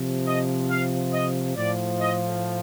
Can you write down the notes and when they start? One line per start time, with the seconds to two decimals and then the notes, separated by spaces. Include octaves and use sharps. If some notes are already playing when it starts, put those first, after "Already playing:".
Already playing: C3 F3
0.26 D#5
0.69 F5
1.13 D#5
1.56 A2 F3 D5
1.99 D#5